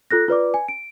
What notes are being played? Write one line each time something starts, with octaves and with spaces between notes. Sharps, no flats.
F4 A4 F#6 A#6
F4 B4 D5 D6
G#5
D7